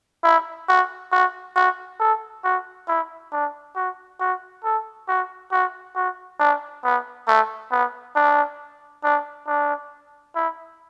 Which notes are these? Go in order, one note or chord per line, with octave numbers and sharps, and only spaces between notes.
E4
F#4
F#4
F#4
A4
F#4
E4
D4
F#4
F#4
A4
F#4
F#4
F#4
D4
B3
A3
B3
D4
D4
D4
E4